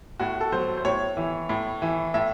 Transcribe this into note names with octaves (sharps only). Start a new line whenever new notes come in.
A2 F#4
A4
F#3 C5
C5
A2 C#5
E3
A2
E3
A2 E5